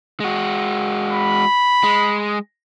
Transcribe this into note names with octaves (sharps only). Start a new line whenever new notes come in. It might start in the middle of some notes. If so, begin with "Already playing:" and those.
G#3 F#4
B5
G#3